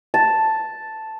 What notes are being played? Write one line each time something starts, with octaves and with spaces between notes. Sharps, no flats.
A5